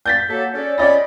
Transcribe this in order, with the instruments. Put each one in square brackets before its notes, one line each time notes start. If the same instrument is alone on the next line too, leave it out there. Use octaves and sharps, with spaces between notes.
[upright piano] G6 A6 B6
[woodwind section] F#3 A#3 A4
C#4 A4 D5
[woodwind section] C#4 F4 B5 [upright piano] D5 D#5 A6